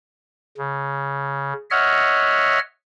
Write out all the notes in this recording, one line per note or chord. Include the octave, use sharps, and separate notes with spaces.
C#3
C#5 D#5 E5 F#5 F6